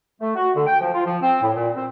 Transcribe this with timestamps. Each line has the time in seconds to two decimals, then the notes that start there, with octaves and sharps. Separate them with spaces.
0.20 A3
0.35 F#4
0.55 D3
0.67 G5
0.81 F3
0.93 F4
1.06 F3
1.22 C4
1.42 A2
1.55 A#2
1.76 C4